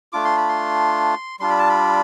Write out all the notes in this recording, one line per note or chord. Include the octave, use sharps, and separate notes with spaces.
A3 D4 F4 D6
C6
B5
C6
G3 D4 F4 C6
B5
A5
B5